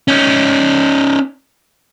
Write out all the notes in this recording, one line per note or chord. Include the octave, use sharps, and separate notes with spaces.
C#4 D#4